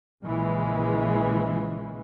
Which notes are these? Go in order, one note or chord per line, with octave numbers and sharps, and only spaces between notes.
A#1 A#2 C#3 E3 G#3